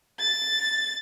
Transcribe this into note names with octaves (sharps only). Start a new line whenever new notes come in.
A6